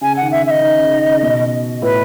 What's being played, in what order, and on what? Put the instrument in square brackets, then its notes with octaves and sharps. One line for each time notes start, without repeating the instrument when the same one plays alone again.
[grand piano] C#3 [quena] G#5
[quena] F#5
[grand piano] D#3
[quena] E5
[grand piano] D#3 [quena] E5
[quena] D#5
[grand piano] D#3
C#3
D#3
C#3
B2
[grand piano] A2 [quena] B4